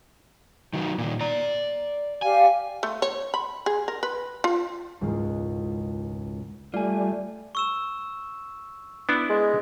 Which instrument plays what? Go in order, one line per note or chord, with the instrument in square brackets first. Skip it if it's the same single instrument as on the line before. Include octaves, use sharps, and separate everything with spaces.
[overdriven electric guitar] D#3 F#3
A#2 D#3
D5 A#5
[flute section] G4 D5 F5 [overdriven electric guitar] G#5
[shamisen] A3
C#5
B5
G#4
A#4
B4
F4
[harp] E1 C#2 G#2 G#3 F4 A#4
[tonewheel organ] G3 [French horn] A3 [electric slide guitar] F4 G#5 [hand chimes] D5
[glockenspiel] C#6 E6 E7
[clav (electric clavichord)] B3 D4 E4
[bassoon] G#3